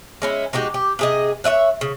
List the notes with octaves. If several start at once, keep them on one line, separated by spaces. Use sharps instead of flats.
G#3 C#4 E4
G#3 D#4 F#4 G4
G4
C3 G#4 D#5
C#5 D#5 E5 F#5
C#3